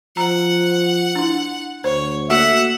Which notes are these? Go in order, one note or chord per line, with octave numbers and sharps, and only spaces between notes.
F3 F#5 A#5
D4 E4
D2 C5 C#5
A#3 F#4 A4 E5 F#5